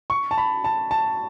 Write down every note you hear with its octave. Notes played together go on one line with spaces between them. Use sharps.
C#6
A5
B5
A5
A5